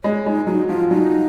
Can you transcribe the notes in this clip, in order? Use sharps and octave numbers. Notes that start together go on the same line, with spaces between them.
G#3 C#5
G#3 D#4
F#3 D#4
F3 F4
F#3 D#4